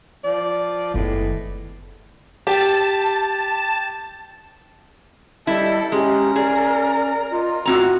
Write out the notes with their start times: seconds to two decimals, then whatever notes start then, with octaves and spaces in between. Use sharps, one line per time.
0.24 F3 D5
0.94 F#1 A2 D#3 G#3 B3
2.47 G4 A5
5.47 G3 E4 A4 D#5
5.92 G#3 C#4 G4 A#4
6.36 G#4 D5
7.31 F4 D#5
7.66 A2 C4 F#4 A#5